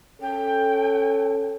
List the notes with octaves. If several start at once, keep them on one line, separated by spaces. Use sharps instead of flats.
C#4 A4 G5